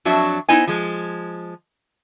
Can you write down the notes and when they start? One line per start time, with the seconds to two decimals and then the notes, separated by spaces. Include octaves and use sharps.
0.05 F2 F#3 D4 F#4 E5
0.49 B3 D#4 E4 C5 D#5 G#5
0.67 F3 G#3